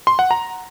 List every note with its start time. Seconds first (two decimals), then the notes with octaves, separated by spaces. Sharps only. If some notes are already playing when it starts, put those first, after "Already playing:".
0.07 C6
0.19 F#5
0.31 A#5